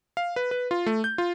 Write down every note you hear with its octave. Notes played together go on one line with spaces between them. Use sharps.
F5
B4
B4
F4
A3
G6
F4